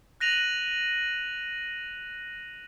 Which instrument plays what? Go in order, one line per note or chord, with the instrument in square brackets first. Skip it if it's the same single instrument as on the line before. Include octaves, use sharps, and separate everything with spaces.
[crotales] F#6 A#6 D#7 F7 F#7